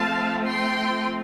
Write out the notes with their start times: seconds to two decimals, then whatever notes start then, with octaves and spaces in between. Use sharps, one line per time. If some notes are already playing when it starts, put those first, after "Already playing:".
Already playing: F3 A3 C4 F5 A5
0.46 G5 C6